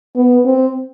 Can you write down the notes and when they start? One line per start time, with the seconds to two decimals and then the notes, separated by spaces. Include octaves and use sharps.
0.15 B3
0.45 C4